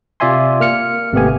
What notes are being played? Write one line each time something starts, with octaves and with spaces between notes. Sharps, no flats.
C3 F4 D5 E5 G#5 C6
A#3 F6 C#7
G#1 C3 A3 B3 G4 G#5